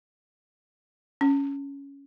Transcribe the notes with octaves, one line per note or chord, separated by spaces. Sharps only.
C#4